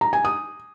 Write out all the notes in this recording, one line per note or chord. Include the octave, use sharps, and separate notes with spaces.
A#5
G#5
D#6